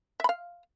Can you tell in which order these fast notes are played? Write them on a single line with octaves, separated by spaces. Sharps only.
E5 B5 F5